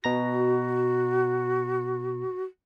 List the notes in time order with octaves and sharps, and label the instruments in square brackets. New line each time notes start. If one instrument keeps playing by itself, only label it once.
[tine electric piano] B2 A#5 A#6 [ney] F#4